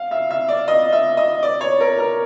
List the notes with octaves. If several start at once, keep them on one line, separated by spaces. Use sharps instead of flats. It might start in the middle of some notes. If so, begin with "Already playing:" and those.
Already playing: F5
E5
E5
D5
D#5
E5
D#5
D5
C#5
A#4
A#4